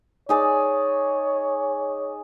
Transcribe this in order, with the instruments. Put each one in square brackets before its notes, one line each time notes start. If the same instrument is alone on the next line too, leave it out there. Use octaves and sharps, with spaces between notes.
[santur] D#4 G#4 D5 [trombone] C#5